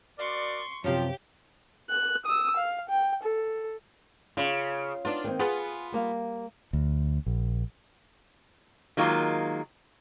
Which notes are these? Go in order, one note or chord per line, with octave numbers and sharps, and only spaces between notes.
F#4 A#4 D5 C6 C#6
F#2 C3 F3 G4 C#5 F5 G5
F#6
D#6 E6
F5
G5
A4
C#3 F4
B3 D4 D#4 F4
D#3 A#3 C4
B3 F4 G#4
G3 A#3 F5
D2
A#1
D#3 F#3 G#3 A#3 F4